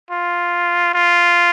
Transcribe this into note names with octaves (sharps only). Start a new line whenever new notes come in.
F4
F4